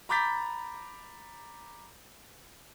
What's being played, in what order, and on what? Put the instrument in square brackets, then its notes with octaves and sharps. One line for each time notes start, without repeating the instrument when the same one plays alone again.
[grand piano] A#5 B5 D6 G6 A6 B6